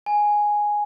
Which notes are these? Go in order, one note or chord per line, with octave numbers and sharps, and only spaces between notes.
G#5